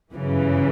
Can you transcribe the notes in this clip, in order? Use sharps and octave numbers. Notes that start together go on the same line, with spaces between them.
G1 F#2 C#3 E3